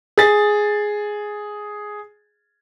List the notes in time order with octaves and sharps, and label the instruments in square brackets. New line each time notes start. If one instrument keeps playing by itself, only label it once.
[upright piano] G#4 A6